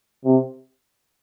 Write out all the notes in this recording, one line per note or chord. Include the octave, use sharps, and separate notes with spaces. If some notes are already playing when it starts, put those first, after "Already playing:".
C3